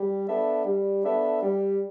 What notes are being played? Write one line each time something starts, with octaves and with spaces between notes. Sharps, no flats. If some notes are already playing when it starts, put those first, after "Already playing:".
Already playing: G3
B3 D4 A4 E5
G3
B3 D4 A4 E5
G3